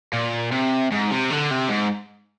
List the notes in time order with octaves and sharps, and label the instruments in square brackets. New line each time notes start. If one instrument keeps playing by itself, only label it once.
[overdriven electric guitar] A#2
C3
G#2
C3
D3
C3
G#2